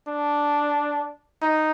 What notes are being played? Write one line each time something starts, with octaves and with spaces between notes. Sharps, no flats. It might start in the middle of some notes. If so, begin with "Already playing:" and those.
D4
D#4